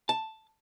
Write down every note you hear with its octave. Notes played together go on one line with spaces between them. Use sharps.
A5